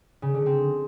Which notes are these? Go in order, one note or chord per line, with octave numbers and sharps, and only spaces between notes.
C#3
D3
C4